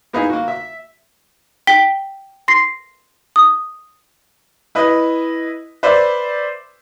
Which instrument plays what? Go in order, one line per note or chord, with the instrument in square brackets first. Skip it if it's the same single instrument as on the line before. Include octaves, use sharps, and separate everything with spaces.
[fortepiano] A#3 B3 D#4 E4 G#4
A#3 F#4
E5
[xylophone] G5 B6 G7
C6 A#6 C7
D#6
[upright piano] E4 B4 D#5
B4 C5 D5 E5